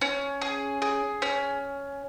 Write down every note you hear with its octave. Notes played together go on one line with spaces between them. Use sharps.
C#4
G#4
G#4
C#4